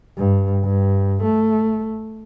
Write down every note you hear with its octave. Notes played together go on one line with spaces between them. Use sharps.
G2
G2
A3